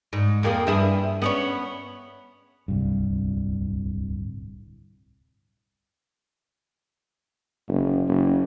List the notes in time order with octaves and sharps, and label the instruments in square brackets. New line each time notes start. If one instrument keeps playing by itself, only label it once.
[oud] G#2
F2 A#3 G#4
G2 E4 G#4
B3 C#4 C#5
[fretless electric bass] D1 C2 G2
[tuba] F#1
F#1